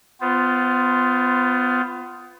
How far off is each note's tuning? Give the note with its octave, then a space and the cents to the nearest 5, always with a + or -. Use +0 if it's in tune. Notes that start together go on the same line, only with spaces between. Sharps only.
B3 +25 F4 -5 C5 +0